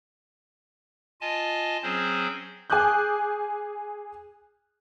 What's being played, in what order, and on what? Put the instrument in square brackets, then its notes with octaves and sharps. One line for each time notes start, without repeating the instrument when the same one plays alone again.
[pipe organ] F4 D#5 G#5 A5
F#3 C4 C#4 G#4 C5
[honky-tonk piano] G#4 G#5 D6 D#6 F#6 G6